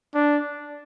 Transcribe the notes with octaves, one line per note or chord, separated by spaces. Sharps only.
D4